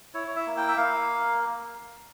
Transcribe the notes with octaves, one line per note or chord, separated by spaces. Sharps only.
E4 C#5
C#5
E5
A#3
G5
E5
A#3 F5